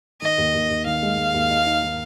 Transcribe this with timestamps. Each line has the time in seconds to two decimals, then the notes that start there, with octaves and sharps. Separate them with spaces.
0.22 D#3 D#5
0.38 D#2
0.54 D#2
0.70 D#2
0.86 D#3 F5
1.03 G#3
1.18 G#3
1.34 D#2
1.50 D#4
1.66 D#4
1.83 D#3